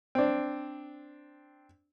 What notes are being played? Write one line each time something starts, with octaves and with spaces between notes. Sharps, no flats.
C4 D4